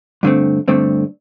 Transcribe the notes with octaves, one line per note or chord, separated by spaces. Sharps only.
G2 D3 A3 C4
G2 D3 A3 C4